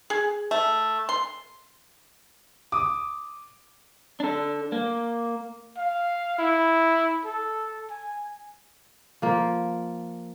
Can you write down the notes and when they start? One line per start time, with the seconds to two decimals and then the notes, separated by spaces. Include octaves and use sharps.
0.10 G#4
0.51 A3
1.09 C6
2.72 D6 D#6
4.20 D4 A4
4.72 A#3
5.77 F5
6.39 E4
7.25 A4
7.90 G#5
9.22 F3 A#3